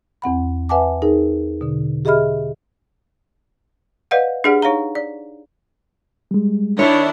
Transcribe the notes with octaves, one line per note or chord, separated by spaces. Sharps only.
E2 C4 F#5 B5
B4 E5 F#5 G#5 A5 D6
D#4 G#4 A#4
B2 D3
G4 G#4 D#5 E5 B5 F6
B4 D5 D#5 F5 F#5
D4 G4 G#4 D5 F#5
D#4 C#5 F5 A#5
D5
G3 G#3
D#3 D4 E4 C#5